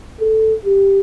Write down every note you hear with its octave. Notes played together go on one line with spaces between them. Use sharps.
A4
G4